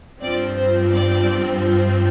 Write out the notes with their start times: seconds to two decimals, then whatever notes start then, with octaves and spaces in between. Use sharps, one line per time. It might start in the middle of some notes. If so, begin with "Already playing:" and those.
0.22 G2 F3 C4 D5
0.57 C5
0.92 D5